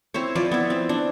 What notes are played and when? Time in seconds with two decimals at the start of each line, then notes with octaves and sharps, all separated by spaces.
0.14 C4 E4 C5 C#5
0.35 F3 B4 D5
0.52 B3 E4
0.70 C4
0.89 D4